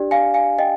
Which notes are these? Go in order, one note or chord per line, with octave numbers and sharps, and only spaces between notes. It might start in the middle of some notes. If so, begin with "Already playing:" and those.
Already playing: D4 G4 D5
F5 G#5
F5 G#5
D#5 G5